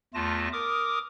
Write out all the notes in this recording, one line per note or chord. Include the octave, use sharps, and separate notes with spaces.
E2 A3 F4 A5 A#6
A#4 D6 D#6